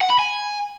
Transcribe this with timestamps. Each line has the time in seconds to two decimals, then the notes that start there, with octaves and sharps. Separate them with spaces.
0.01 F#5
0.10 B5
0.19 G#5